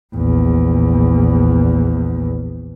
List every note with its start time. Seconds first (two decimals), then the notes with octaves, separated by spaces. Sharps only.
0.15 A#1 E2